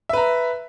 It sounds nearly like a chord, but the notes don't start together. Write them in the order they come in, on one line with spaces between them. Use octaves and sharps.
E5 B4 A#5